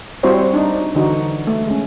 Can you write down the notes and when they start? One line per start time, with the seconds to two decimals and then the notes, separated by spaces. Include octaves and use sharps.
0.23 G3 C4 E4 F#4 C5 C#5
0.54 D4 D#4
0.95 D3 E3 D#4 F#4
1.47 A3
1.67 G#3 C#4